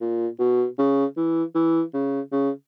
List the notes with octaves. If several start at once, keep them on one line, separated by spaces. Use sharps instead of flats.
A#2
B2
C#3
E3
E3
C#3
C#3